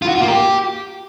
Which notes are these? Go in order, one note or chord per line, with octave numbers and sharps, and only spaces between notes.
F4
F#4
F4
A#3
G4